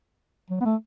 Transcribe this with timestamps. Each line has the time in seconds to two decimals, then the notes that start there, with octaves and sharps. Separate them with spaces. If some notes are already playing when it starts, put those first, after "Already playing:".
0.50 F#3
0.61 B3
0.65 A3